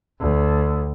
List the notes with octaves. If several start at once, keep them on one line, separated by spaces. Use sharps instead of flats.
D2